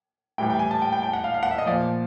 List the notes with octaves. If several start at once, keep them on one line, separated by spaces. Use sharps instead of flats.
A2 E3 G3 G5
G5
G#5
A5
G5
G5
G5
F#5
F5
F5
F#5
E5
D#5
A#2 F3 D5